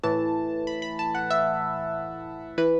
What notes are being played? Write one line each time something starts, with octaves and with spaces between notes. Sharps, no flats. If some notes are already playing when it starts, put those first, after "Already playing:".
A2 E3 A5
B5
B5
A5
F#5
E5
E3 B4